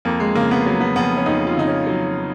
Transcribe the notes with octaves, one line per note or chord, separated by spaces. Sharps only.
F2 A#3
G#3
C#3 A#3
B3
F#3
B3
F2 B3
C#4
F2 D#4
F4
C#3 D#4
C#4
F#3